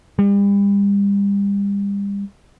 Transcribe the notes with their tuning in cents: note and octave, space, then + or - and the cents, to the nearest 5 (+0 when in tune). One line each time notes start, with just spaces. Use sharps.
G3 +35